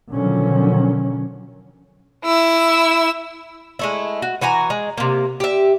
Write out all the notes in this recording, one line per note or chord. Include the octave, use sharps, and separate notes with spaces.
B2 D3 D#3 F3 F#3 C#4
E4 E6
G#3 A3 E4
F#4
E3 F#4 G#5 A#5
G#3
C3 A#3
G4 E5